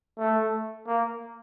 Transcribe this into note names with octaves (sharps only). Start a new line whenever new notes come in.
A3
A#3